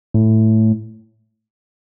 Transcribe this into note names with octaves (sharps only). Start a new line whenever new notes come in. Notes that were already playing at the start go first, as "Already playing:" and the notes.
A2